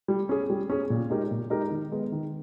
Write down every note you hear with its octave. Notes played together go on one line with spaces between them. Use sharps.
G3
C#4 G#4
G3
C#4 G#4
A#2
G#3 D#4 G4 A#4
A#2
G#3 D#4 G4 A#4
D#3
G#3 B3
D#3